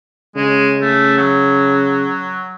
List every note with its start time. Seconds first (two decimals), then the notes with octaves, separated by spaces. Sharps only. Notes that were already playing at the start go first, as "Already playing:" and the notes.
0.36 C#3 G#3
0.81 A3
1.17 F#3